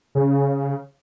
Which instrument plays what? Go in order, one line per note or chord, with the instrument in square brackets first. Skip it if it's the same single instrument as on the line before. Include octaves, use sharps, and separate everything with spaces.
[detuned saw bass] C#3